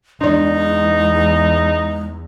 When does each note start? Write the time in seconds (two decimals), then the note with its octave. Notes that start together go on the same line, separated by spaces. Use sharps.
0.21 E2 G#3 D4 D#4 D5